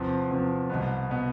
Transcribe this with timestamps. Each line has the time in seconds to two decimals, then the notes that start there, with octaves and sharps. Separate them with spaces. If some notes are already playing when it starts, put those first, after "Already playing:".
Already playing: E2 C3 F3
0.30 E2 C3 F3
0.70 C2 B2 B3
1.10 B2 B3